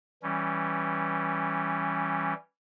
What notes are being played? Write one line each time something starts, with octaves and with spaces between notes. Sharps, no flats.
E3 G3 C#4